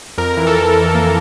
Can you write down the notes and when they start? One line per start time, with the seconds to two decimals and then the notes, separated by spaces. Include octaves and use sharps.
0.18 F2 A#4
0.37 E3
0.47 A4
0.56 F2 A#4
0.76 F2
0.95 A#3 A4